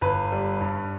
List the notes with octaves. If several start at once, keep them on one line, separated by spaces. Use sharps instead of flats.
G1 B4
G3
G2